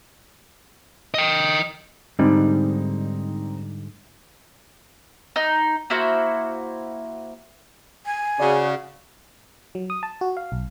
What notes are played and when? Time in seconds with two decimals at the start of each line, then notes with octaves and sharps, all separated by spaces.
1.14 D#5 G5
2.19 G#2 D3 G3 C4 D#4
5.36 D#4
5.90 A#3 E4 F#4 C5
8.06 G#5
8.40 C#3 F#4 D5
9.75 F#3
9.90 D#6
10.03 A5
10.21 F#4
10.37 F5
10.52 B1